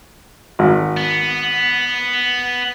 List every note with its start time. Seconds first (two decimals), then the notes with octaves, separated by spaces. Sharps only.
0.59 G#1
0.97 B3